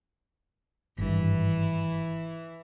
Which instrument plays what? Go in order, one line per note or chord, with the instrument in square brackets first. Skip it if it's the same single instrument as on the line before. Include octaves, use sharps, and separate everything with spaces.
[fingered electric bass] G#1 G2 [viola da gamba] E3